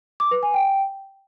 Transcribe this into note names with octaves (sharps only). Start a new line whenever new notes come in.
D6
B4
G#5
G5